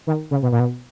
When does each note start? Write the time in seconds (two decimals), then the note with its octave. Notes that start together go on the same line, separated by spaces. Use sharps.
0.07 D#3
0.31 C#3
0.42 B2
0.52 A#2
0.59 B2